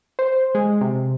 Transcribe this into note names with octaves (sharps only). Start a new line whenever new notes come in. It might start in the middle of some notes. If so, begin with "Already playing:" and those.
C5
G#3
C3